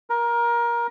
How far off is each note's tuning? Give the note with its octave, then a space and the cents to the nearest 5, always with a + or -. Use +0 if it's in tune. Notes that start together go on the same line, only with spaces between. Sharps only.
A#4 +20